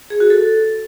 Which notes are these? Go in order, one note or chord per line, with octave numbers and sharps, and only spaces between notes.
G#4
F#4
A4